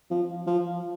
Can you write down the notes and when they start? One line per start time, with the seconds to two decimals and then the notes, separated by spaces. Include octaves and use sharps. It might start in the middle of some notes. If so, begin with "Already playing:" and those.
0.11 F3
0.47 F3